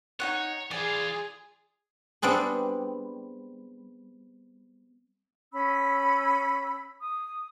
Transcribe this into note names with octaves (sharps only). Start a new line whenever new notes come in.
D#4 F4 C#5 F#5
E3 F4 G#4 D5 G#5
G3 B3 C4 D4 G#4
C#4 B5 E6
D#6